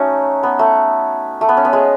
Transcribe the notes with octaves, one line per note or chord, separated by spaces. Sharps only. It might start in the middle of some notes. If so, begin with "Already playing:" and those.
Already playing: A3 C#4 D#4 F#4
B3
A3
A3
B3
C#4
B3
G#3